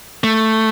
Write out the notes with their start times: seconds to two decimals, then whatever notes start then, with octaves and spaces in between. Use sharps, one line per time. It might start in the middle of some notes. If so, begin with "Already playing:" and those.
0.24 A3